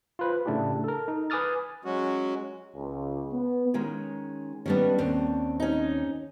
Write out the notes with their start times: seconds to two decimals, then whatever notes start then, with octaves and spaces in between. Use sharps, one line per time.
0.19 F4 B4 C5
0.46 A2 C#3 A3 D4 E4 G4
0.84 A4 A#4
1.08 D#4
1.30 B4 G#5 D6 D#6 F6 A6
1.85 F#3 G#3 C#4 F#4
2.74 C#2
3.32 B3
3.74 D#3 G#3 C#4
4.66 D#3 G3 B3 C#4 D4
4.98 D#2 C4
5.60 C#4 D#4